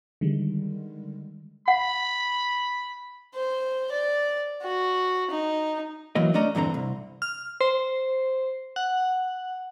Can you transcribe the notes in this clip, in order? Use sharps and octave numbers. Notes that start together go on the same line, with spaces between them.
D3 D#3 G3 G#3
F#5 B5
C5
D5
F#4
D#4
E3 F#3 A#3 D#5
A3 C#4 D4 D5 D#5 A#5
E2 G2 D3 C4 A#5
C2
F6
C5
F#5